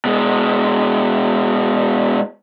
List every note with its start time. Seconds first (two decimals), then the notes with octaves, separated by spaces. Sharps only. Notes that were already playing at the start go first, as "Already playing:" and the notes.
0.05 B2 G#3